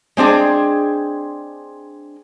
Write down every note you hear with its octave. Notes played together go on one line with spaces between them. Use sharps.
G#3 C4 D4 G#4